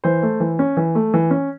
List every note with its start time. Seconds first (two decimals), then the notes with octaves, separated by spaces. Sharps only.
0.04 E3 C5
0.23 A3
0.40 E3
0.59 C#4
0.77 E3
0.95 A3
1.14 E3
1.31 C#4